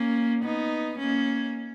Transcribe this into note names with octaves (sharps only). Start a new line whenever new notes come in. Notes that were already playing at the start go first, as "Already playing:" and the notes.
Already playing: A#3 C#4
B3 D#4
A#3 C#4